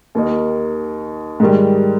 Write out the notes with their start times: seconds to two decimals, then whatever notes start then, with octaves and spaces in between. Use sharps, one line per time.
0.15 D#2 D#3 A#3 D#4
1.40 G#2 D#3 G3